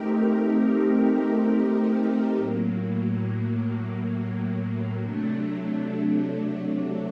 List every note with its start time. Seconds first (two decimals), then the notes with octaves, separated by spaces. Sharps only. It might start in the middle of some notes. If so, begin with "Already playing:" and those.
Already playing: A3 C4 D#4 G4 A#4
2.35 A2 F#3 A#3
5.01 C3 F#3 A3 D4